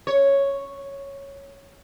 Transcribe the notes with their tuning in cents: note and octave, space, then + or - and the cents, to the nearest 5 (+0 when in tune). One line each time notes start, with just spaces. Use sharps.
C#5 +0